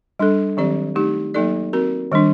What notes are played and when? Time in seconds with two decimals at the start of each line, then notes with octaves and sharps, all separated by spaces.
0.19 G3 D4 A4
0.57 D#3 F#3 C4 G4 D5
0.95 A3 D#4 G4
1.34 F#3 A#3 D#4 A4 D5
1.73 C4 F#4 A#4
2.12 D#3 G3 D4